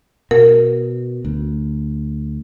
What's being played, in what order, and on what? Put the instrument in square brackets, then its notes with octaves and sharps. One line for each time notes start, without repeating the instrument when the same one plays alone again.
[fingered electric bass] B2 [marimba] A#4
[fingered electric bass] D2